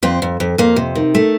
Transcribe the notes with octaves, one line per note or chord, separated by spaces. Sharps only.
F2 C4
F2
F2
F2 A#3
C3
D#3
A3